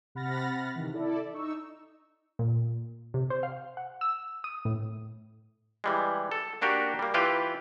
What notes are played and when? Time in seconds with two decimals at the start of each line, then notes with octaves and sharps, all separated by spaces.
0.15 C3 F#5 B5 F6 A6 A#6
0.75 C3 D#3 E3
0.93 E4 A4 D5
1.33 D#4 C#6 E6
2.39 A#2
3.14 C3
3.30 C5
3.43 F5
3.77 F#5
4.01 E6
4.44 D#6
4.65 A2
5.84 E3 G3 G#3
6.32 A4
6.62 A#3 D4 F#4 G4 A#4
6.99 G3 A#3
7.14 E3 E4 F4 G4 B4